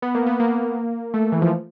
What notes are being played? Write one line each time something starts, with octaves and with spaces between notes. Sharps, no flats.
B3
A#3
B3
A#3
A3
E3
F3